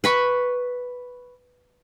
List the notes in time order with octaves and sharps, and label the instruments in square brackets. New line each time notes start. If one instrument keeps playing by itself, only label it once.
[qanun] B4 B5 C#6